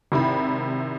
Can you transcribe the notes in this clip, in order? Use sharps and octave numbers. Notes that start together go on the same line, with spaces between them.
G#1 C3 E4 B5